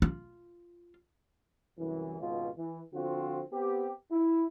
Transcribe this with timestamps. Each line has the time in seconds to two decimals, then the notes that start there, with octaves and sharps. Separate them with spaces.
0.02 F4
1.79 C2 F#2 E3
2.20 G#1 C#2 B2 F4
2.57 E3
2.94 D3 F3 C4 F4 F#4
3.52 B3 C4 G4
4.11 E4